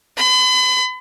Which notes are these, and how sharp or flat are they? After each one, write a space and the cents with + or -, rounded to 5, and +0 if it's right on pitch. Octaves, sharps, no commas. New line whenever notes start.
B5 +40